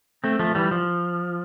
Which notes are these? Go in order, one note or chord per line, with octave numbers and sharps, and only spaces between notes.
A3 C4
F3 A3
E3 G3
F3